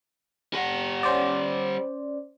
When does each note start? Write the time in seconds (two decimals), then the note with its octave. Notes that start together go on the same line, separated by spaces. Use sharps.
0.54 G3 F#5
1.03 C#4 C5 D5